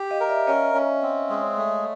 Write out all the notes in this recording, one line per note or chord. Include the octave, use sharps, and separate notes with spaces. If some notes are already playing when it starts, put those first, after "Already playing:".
Already playing: G4
D#5 F5
A#4
D5 E5
C#4 C#5 D#5
C#4
C4
G#3
A3